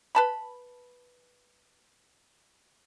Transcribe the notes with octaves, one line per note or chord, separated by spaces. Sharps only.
B4 A5 B5